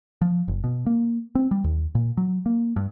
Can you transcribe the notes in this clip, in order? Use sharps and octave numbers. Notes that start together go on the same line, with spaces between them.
F3
F#1
B2
A#3
C4
G3
D#2
A#2
F#3
A#3
G2